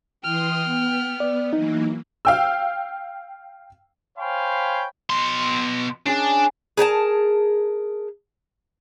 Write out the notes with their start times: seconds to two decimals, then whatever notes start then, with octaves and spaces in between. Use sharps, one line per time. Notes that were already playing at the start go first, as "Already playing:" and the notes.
0.24 E3 G5 C6 D#6 F6
0.64 B3
1.20 D5
1.53 E3 F#3 A#3 D#4
2.25 F5 G5 E6
4.18 C5 C#5 F5 G5 G#5 B5
5.10 B2 C6
6.06 C#4 D4 G#4
6.77 G#4 A#4 G5 A5